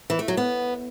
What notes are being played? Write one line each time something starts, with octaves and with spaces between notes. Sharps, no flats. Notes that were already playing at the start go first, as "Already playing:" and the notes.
E3
A3
F#3
B3